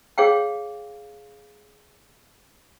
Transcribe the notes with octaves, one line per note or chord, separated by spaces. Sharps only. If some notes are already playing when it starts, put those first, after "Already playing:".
G#4 C#5 F5 G5